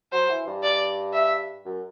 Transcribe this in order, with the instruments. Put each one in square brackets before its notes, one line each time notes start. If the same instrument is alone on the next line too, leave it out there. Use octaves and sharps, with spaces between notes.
[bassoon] F#3 [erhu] C5
[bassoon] E3
G2
[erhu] D5
E5
[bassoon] F#2